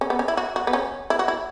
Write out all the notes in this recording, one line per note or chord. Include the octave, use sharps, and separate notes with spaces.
C#4
B3
C#4
E4
F#4
F#4
B3
C#4
E4
F#4
E4